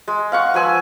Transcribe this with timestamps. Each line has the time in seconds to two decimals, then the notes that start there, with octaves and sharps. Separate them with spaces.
0.08 G#3
0.32 F5 F#5 C#6
0.54 F3 B4 G#5 E6